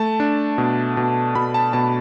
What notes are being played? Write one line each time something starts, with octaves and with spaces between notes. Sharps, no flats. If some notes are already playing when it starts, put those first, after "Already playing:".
Already playing: A3 A5
D4
B2
B2
B2 B5
A5
B2 A5